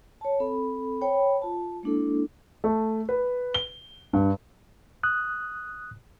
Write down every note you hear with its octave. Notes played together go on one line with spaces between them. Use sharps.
C#5 A5
C4 A4 B5
C5 C#5 G5 B5
F4 A5
G#3 A#3 D4 E4 A4
A3
B4
G7
G2
D#6 F#6